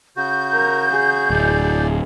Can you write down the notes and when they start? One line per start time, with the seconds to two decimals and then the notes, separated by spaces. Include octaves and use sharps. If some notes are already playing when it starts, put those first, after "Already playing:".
0.17 C#3 F#4 G6
0.53 A#4
0.91 G#4
1.30 D1 D5